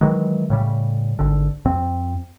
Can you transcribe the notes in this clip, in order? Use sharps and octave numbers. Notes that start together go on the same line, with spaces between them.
D#3 E3 F#3 G#3
A2 C#3 G3
G#1 D3
F2 C4